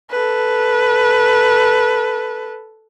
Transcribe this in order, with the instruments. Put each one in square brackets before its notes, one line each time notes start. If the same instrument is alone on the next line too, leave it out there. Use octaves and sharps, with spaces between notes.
[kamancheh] A4 B4